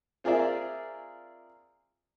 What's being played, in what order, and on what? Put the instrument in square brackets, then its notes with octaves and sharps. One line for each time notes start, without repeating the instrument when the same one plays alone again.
[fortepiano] C4 F4 G#4 A#4 D5 E5